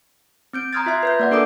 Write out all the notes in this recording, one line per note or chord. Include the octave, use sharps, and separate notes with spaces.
C4 G6 D7
A#5 C6 D#6 F6 G#6 A6
F4 E5 C6 G#6
B4 E5 G6
A#3 D5 F#5
D4 A4 A#4 D6 D#6 D7